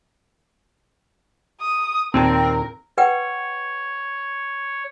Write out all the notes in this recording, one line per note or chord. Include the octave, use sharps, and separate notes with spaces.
D#6
D#2 A#2 C4 A#4 A5
B4 C#5 F#5 G5